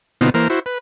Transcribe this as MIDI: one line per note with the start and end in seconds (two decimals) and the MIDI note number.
0.21 0.30 47
0.21 0.30 50
0.21 0.30 59
0.21 0.30 60
0.21 0.30 63
0.21 0.30 65
0.34 0.48 52
0.34 0.48 58
0.34 0.48 70
0.34 0.48 72
0.50 0.60 64
0.50 0.60 66
0.50 0.60 72
0.66 0.78 71